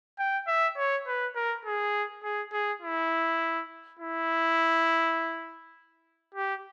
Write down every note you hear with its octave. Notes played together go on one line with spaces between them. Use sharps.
G5
E5
C#5
B4
A#4
G#4
G#4
G#4
E4
E4
G4